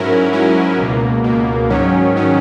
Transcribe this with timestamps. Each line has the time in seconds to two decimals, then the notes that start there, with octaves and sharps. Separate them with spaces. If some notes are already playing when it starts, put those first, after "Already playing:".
Already playing: G#2 F#3 C#4 E4 A#4
0.32 G#2 F#3 C#4 E4 A#4
0.79 C#2 B2 A#3
1.24 C#2 B2 A#3
1.69 G#2 D#3 F#3 C#4
2.15 G#2 D#3 F#3 C#4